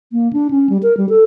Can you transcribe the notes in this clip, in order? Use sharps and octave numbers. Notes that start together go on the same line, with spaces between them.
A#3
D4
C#4
G3
A#4
G3
A4